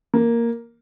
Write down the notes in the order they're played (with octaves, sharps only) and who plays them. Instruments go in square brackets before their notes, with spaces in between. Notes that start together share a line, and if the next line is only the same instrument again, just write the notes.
[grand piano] A#3